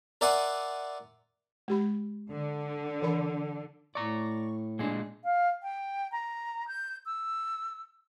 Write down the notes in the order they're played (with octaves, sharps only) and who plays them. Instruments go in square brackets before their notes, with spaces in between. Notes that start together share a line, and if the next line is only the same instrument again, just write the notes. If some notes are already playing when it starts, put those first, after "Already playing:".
[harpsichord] A#4 D5 E5 F#5 G#5 C6
[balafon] G#3 G4 B5
[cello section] D3
[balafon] E3 A#4 B5
[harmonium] A2 [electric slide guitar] D5 A#5 [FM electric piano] C#6
[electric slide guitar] A#2 G#3 [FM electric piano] D4 G#5
[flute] F5
G5
A#5
G6
E6